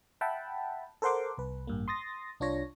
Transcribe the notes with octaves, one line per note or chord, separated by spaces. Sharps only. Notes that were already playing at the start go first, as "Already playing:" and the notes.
E5 F#5 G5 A5 B5
A4 A#4 C5 F#5 C6 D6
C2 B4
A1 G2 A#3
C6 D#6 A6 A#6
C2 D4 F4 C#5 A#6